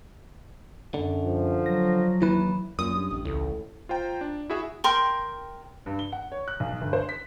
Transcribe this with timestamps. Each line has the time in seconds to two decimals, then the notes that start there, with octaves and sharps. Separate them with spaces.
0.94 F#2 D3
1.25 F3
1.66 F#3 A#6
2.22 D#2 E3 E4 B4
2.79 F#2 A#2 D#6
2.96 G2
3.11 A1
3.25 C#2 A2
3.89 F4 C5 G5 A#5
4.21 D4
4.50 E4 F#4 G#4 E5
4.84 A#4 G5 C6
5.86 G2
5.99 G7
6.12 F#5
6.32 C#5
6.48 F#6
6.60 B1
6.81 G1
6.93 C5
7.09 B6